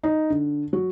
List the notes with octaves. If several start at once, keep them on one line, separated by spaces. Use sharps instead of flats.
D#4
D3
F#3